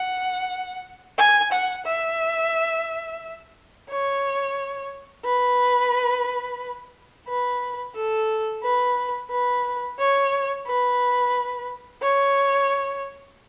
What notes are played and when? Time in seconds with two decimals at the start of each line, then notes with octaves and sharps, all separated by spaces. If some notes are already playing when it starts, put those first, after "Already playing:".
Already playing: F#5
1.18 G#5
1.52 F#5
1.86 E5
3.89 C#5
5.25 B4
7.28 B4
7.95 A4
8.63 B4
9.31 B4
9.99 C#5
10.67 B4
12.02 C#5